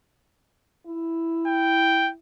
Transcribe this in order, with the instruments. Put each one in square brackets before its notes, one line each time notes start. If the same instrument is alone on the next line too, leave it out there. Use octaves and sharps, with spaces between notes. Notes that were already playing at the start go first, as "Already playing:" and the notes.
[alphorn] E4
[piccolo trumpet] G5